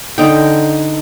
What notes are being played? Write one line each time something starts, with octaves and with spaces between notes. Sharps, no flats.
D3 D#4 G5